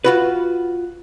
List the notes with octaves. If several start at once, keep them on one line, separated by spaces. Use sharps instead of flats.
F4 F#4 B4